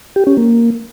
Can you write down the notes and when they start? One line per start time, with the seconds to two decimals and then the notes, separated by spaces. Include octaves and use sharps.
0.16 G4
0.27 C#4
0.37 A#3